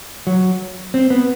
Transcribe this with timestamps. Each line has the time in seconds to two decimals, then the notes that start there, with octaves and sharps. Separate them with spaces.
0.27 F#3
0.94 C4
1.10 B3